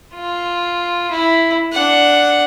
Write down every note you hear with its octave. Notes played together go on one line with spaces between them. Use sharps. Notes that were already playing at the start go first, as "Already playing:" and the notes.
F4
E4
D4 F#5